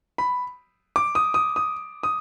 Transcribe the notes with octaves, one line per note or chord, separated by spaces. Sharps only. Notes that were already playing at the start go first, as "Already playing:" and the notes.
B5
D6
D#6
D#6
D#6
D#6